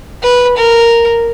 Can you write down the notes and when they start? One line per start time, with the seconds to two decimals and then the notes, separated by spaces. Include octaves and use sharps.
0.23 B4
0.57 A#4